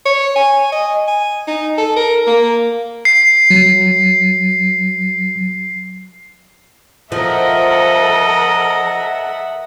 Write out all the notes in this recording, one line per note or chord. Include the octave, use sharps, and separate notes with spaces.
C#5
G#5
D#5
G#5
D#4
A4
A#4
A#3
C7
F#3
F3 A4 A#4 D#5 E5 F#5